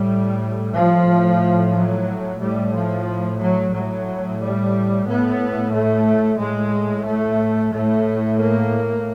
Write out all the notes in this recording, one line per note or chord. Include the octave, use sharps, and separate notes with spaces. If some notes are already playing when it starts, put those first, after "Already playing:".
Already playing: A2 G3
F3
A2
F#3
A2 G3
F3
F#3
A2 F#3
G3
A2 B3
A3
A2 G#3
A3
A2 A3
A#3